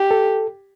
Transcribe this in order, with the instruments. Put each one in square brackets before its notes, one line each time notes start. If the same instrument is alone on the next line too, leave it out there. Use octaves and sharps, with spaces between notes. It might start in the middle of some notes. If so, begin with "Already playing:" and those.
Already playing: [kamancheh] G4
[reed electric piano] A4